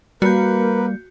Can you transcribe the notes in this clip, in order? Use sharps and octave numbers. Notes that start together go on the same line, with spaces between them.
G3 A#3 F#4 A#4 B4 G6